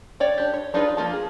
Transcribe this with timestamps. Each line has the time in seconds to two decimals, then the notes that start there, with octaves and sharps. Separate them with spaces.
0.20 C#5 D5 G5
0.38 D4 G4
0.54 C#5
0.74 D4 D#4 F4 G#4 B4
0.97 F3 A#3 F4 A5
1.13 G#4